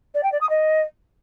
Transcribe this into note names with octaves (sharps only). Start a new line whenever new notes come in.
D5
G5
D5
D#6
D#5